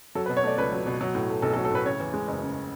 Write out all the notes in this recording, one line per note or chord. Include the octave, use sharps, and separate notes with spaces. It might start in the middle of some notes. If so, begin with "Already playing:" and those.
F#3 A4
B4
B2
C#5
A3 D5
C#2 B4
F#3
B2
F#3
A2
A3
B1 A4
A4
F#3
A4
A2 B4
C#3 C#5
E2
G#3
F#1
C#3